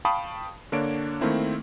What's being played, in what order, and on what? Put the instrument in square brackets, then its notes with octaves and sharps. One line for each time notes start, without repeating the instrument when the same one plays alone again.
[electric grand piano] F5 G5 A5 B5 C#6 D#6
D3 A#3 D4 C#5 D7
D#3 A3 A#3 C4 E4